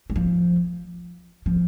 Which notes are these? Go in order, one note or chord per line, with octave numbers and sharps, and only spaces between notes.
G3
F3
F3